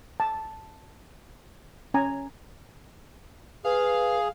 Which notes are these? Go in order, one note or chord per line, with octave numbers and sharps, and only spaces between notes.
A5
C#4 G#5 A#5
G#4 B4 F5